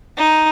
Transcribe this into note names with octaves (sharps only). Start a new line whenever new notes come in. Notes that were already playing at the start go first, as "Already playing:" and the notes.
D#4